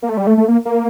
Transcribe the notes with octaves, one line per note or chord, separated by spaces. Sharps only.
A#3
A3
G3
A3
A3
A#3
A#3